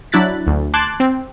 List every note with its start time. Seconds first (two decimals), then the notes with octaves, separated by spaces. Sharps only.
0.12 F#3 D4 E4 F#6 A6 B6
0.47 D2
0.74 A5 C6 D6 F#6 G#6 A6
1.00 C4